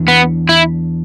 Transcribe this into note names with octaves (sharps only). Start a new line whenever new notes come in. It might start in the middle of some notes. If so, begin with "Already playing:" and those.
Already playing: E2 E3 D4
B3
E4